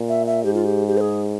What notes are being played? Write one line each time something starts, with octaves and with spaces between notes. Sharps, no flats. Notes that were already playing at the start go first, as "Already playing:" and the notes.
Already playing: A#2
E5
E5
G#2 G4
F4
G4
G4
C5
G#4